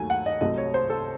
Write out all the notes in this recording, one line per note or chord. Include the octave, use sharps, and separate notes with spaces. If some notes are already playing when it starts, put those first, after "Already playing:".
Already playing: D#2 D#3 F#3 A3 G#5
F#5
D#5
C2 C3 F#3 A3 D#5
C#5
C5
A4